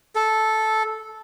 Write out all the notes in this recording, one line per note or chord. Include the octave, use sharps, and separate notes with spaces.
A4